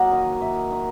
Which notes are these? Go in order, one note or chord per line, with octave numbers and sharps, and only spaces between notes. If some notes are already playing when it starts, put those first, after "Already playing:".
Already playing: F#3 A#3 D#5 F#5
D#3
D#3 E5
D#3